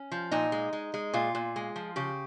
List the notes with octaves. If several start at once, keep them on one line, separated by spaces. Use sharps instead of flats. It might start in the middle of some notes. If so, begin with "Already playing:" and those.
Already playing: C#4
F3
A#2 D#4
G#3
G#3
G#3
A#2 F4
A#2
G#3
F3
C#3 G4